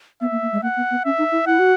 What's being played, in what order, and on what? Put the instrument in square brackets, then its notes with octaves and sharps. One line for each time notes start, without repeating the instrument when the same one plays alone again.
[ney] B3 [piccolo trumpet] E5
[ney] A#3
A#3
G#3
[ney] A#3 [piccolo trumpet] F#5
[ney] B3
B3
[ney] C#4 [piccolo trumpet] E5
[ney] D#4
E4
[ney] E4 [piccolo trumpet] F#5
[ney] F#4